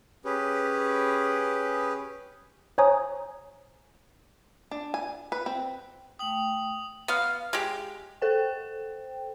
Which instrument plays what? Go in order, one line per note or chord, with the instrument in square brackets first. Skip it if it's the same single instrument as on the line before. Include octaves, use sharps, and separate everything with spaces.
[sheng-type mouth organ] C#4 G4 G#4 B4
[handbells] C5 C#5 G#5 A#5 D#6
[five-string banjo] D4
G#5
B4
C4
[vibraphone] A3 G5 [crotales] D#6 F#7
[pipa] B3 F5
G#3 G4
[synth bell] A4 C5 G5